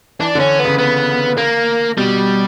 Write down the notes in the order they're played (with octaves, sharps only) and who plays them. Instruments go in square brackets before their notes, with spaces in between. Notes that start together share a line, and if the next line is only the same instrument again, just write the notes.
[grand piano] E3 [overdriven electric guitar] D4
[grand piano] D3
[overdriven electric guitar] C#4
B3
[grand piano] C#3
[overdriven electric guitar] B3
A#3
[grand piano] B2 [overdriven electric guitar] G3